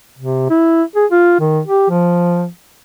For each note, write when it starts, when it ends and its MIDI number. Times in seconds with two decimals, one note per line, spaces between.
0.19 0.49 48
0.50 0.83 64
0.96 1.06 68
1.12 1.37 65
1.40 1.60 51
1.67 1.86 67
1.90 2.47 53